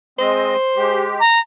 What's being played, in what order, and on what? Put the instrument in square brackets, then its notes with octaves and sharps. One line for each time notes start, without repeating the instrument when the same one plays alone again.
[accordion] G#3 C4 D#5 [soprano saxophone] C5
[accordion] G#3 G4
[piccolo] A#5